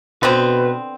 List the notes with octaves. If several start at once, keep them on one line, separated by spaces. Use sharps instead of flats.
B2 D3 B3 C4 B4